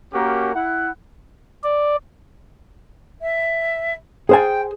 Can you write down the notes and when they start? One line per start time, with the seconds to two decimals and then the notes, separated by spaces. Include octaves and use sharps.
0.13 A#3 C#4 F#4 G4 A#4
0.54 E4 F#5
1.63 D5
3.21 E5
4.29 G#4 C5 G5 G#5